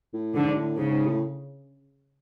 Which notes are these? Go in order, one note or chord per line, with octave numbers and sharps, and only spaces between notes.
A2
G#2 D3
A2
G#2 C#3
G#2
A2